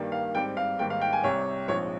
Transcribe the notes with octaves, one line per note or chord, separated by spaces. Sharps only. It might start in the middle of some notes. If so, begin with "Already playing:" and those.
Already playing: G2 D#3 G3 A#3
F5
G#2 G3 C4 G5
F5
G#2 D#3 G3 A#3 G5
F5
G5
G#5
C2 C3 G3 C#5
A#1 G#2 F3 C4 C#5